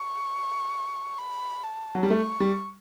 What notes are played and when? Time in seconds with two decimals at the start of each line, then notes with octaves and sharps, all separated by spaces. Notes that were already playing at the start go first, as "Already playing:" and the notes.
Already playing: C#6
1.18 B5
1.64 A5
1.95 F#3
2.03 G3
2.10 A3 C#6
2.40 G3